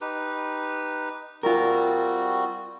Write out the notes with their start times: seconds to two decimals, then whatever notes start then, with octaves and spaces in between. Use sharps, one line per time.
0.01 D#4 G4 B4
1.43 G3 C4 F4 F#4 A#4